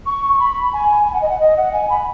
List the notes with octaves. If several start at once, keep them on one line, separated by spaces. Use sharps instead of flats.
C#6
C#6
B5
G#5
G#5
F#5
D#5
F#5
D#5
F#5
G#5
B5